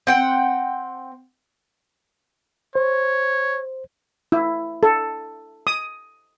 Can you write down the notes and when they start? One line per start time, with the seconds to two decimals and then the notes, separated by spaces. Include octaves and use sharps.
0.07 C4 F#5 G5
2.75 C5 C#5
4.32 E4
4.83 A4
5.67 D#6